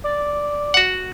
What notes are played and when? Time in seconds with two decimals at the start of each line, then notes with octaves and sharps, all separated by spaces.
0.04 D5
0.74 F#4 F#5